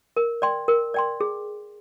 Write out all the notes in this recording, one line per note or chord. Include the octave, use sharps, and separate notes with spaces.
A#4
D5 G5 C6
A#4
D5 G5 C6
G#4